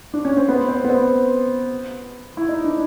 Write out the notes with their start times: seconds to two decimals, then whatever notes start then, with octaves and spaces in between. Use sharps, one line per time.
0.14 D4
0.25 C#4
0.37 C4
0.48 B3
0.68 C4
0.84 B3
0.89 C4
2.37 E4
2.48 D#4
2.64 D4